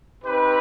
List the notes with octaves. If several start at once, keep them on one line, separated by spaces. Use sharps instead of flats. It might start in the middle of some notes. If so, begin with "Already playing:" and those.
C4 D#4 G4 B4